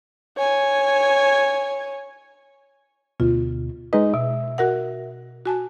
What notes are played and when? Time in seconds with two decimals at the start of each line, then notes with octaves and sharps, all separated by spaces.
0.37 C#5 G#5
3.20 D2 B2 F4
3.93 G#3 D#4 B4 D#5
4.14 B2 E5
4.58 F#4 A#4 F#5
5.46 F#4 G#5 A5